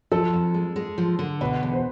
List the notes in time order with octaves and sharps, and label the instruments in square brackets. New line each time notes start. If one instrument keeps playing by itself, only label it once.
[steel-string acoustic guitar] F3 [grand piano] A4
[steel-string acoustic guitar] F2
G#3
G#3
F3
D3
[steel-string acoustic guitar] B2 [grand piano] B4
[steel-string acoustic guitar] E2
[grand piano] C5